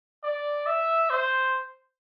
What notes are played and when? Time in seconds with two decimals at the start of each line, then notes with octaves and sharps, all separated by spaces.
0.24 D5
0.66 E5
1.10 C5